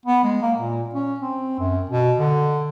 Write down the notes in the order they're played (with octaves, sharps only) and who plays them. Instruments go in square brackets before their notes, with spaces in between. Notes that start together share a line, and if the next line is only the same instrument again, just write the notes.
[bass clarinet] B3
G#3
A#3
A#2
C#4
C4
F#2
B2
D3